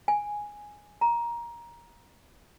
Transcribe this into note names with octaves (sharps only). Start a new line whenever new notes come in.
G#5
A#5